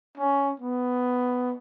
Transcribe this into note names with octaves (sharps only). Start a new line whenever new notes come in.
C#4
B3